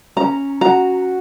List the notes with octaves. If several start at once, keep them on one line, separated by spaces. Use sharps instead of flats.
C#4 A#5
F#4 A#5